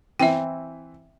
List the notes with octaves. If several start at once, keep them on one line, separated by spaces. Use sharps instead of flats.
E3 C4 E4 E5 G5